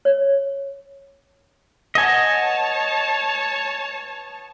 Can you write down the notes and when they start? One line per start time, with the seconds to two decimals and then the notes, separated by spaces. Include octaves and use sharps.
0.05 C#5
1.95 B3 C#5 D#5 G#5 A5 E6